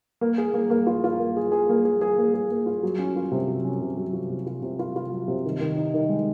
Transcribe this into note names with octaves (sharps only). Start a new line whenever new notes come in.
A#3
G#4
A#3
A#3
F4
F4
A#3
G#4
G#4
A#3
G#4
G#4
A#3
G#4
A#3
F4
F#3
C#4
F4
C3
F#3
C#4
C3
F#3
F4
C3
F4
C3
F4
F4
F#3
C3
D#3
D#3
D#4
D#3
G#3